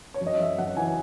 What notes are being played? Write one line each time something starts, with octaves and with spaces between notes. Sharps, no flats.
C#5
F#2
D#5
F#2 E5
F#2 F#5
E3 G#5